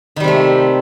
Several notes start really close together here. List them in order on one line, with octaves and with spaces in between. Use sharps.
D#3 G3 C3 A3